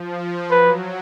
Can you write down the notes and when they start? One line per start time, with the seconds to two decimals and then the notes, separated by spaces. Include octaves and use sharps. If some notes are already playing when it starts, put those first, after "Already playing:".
Already playing: F3
0.14 F3
0.50 F#3 B4